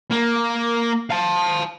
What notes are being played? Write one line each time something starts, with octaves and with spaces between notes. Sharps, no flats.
A#3
F5 A5